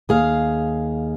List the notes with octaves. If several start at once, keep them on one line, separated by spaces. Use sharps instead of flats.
D#2 G#4 F5